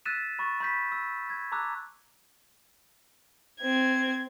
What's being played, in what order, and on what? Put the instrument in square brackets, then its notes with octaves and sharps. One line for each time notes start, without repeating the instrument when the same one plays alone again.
[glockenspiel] E6 F#6 A6 B6 D#7 E7
B5 C#6 A6
B5 G6 B6
E6
G#6
A5 A#5 D6 E6 F#6
[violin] C4 G#6